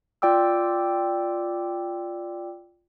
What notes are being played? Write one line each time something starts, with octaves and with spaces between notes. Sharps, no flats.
F4 D5 G5 D6 E6